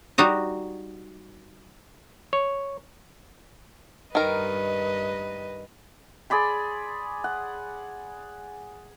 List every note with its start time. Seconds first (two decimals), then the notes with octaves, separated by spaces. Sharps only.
0.18 G3 D#4 F#4 D#5
2.33 C#5
4.15 G2 D#3 A#4 B4 D#5
6.30 G#4 D5 B5 C6
7.24 F#5